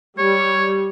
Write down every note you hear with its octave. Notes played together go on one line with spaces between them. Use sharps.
G3 C#5